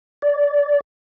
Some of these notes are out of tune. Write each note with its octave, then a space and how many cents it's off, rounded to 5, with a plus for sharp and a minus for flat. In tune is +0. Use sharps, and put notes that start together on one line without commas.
D5 -20